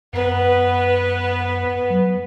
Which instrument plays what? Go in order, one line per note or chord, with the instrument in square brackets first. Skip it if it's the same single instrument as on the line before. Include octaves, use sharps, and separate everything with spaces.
[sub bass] F#2 [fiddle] B3 B4
[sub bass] F#3